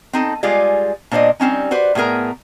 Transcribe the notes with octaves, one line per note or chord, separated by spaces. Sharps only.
C4 D#4 A4
G3 G#3 F4 G#4 D5
A#2 D4 C5 D5 D#5
G3 C4 C#4 D#4
F#4 B4 C5 D5
A2 B3 G#4 A#4 A#5